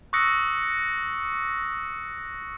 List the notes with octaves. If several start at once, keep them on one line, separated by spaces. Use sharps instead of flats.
C#6 D#6 E6 F#6 A#6 C#7